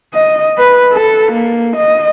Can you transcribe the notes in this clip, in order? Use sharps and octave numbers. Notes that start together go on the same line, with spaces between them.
D#5
B4
A4
A#3
D#5